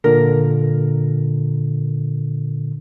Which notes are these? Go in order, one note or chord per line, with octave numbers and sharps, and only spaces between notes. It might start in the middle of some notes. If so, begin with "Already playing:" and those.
A#2 D3 A#4